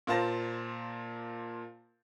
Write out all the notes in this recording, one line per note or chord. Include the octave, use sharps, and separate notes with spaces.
A#2 A#3 C5 A5 A#6